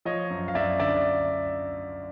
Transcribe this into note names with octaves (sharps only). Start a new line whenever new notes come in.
F3 C#5 D#5
F#2
F5
F#2 D5 E5
D3 D5 E5